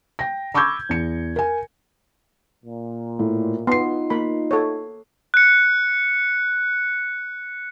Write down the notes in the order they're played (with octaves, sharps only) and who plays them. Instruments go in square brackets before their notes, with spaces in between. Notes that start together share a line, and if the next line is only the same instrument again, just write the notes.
[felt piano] G5 A#6
B5 C#6 D6 E6 G6 G#6
E2 C#7
A#4 G#5
[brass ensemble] A#2
[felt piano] A2
[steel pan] B3 [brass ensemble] D#4 F4 [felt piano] C6 C7
[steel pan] A#3 B5
A4 C#5
[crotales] F#6 C#7